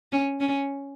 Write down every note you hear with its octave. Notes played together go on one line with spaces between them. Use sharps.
C#4
C#4